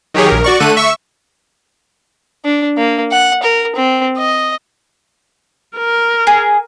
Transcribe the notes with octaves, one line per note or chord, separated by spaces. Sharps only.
D#3 F#3 G4 G#4 C#5
A#1 A#4
F#4 D5 C#6
D3 A3 A4 F#6 D#7
E5 C#6 E6
D4
A#3
F#5
A#4
C4
D#5
A#4
G#4